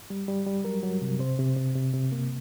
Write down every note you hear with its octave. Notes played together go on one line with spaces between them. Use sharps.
G3
G3
G3
F#3 A#4
F#3
C3
C3 C5
C3
C3
C3
C3
A#3